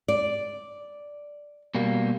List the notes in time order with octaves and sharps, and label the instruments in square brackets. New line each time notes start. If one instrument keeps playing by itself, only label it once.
[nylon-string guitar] D5
[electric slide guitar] B2 G3 A#3